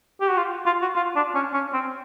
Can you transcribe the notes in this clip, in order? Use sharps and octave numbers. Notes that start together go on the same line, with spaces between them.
G4
F#4
F4
F4
F#4
F4
D4
C#4
C#4
C4